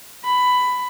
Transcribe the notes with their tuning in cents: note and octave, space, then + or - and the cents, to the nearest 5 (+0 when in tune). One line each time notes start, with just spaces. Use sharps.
B5 +15